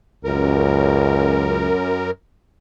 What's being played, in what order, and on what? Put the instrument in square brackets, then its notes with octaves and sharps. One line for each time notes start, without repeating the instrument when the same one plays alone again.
[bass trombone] C#2 [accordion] F#2 A#4